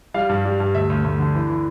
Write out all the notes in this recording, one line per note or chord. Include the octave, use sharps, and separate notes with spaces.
G3 F5
G2
G3
G2
D2 E5
D2
D2
D3
E3
E3